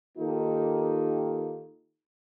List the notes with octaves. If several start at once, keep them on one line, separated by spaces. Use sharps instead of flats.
D#3 A#3 D#4 F4 G4 A4